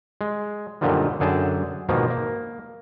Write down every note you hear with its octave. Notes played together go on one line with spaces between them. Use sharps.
G#3
F#2 A#2 D3 D#3 F3 G3
F#2 D3 G#4 G5 A5
G#2 B2 D#3 F3 A#3
A#3